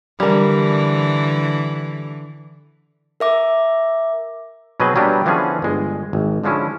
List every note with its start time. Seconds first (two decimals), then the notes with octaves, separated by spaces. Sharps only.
0.20 D3 E3 G3 A#4
3.20 A#4 E5 D6
4.80 B2 F#3 C4 G#4 B4 D#5
4.96 F#3 G3 A#3 B3 D4 G4
5.25 D3 E3 F3 B3 C#4 G#4
5.62 G1 G#3
6.13 G#1
6.44 D3 F3 G#3 C#4 E4